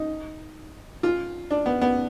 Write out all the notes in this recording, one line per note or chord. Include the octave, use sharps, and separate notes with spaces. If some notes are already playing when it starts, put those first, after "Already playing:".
Already playing: D#4
F4
D4
B3
B3